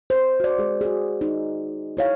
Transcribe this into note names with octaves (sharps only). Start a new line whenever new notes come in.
C5
F#4 D5
G#3 G#4
F#4 G#4
D#4
E4 C#5 F5